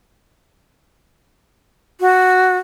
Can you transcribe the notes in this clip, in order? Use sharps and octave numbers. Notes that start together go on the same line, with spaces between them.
F#4